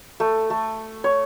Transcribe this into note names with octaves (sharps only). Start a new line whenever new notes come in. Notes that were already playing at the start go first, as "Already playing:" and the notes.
A3
A3
C#5